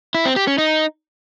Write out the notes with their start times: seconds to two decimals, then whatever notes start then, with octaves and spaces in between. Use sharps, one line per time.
0.15 E4
0.25 C4
0.36 G4
0.47 C#4
0.58 D#4